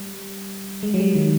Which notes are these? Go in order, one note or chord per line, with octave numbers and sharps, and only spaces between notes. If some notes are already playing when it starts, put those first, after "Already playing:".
Already playing: G3
G#3
F#3
G3
D#3